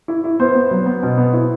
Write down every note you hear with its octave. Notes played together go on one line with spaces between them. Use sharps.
E4
E4
B3 C5
B3
F#3
B3
B2
B3
E4